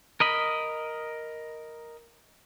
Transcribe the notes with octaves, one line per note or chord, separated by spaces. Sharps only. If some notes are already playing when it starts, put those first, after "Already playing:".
A#4 D#5 B5